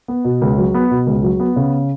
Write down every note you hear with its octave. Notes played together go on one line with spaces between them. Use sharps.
B3
B2
C#2
F#3
B3
B2
C#2
F#3
B3
C#3